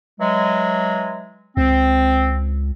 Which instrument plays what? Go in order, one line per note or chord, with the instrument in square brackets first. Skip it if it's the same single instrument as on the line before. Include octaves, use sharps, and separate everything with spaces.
[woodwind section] E3 F#3 G#3
[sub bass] C#2 [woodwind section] C4